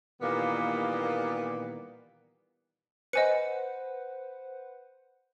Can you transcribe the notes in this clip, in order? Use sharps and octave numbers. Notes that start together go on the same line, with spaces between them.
A#2 D#3 E3 G3 A#3 B3
B4 C5 D#5 F#5 G#5 C#7